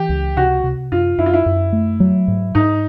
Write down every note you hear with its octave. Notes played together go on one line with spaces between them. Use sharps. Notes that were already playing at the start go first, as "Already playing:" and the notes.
Already playing: E3 G4
C#2
C3 F#4
C3
F#2 F4
F#2 E4
F4
E4
F#2
A3
F#3
G#2
G#2 D#4